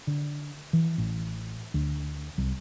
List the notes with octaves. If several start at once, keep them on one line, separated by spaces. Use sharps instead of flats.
D3
E3
A1
D2
C2